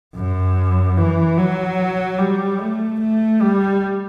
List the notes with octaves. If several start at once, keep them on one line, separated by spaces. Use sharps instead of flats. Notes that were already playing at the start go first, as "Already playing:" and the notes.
F#2
E3
F#3
G3
A3
A3
G3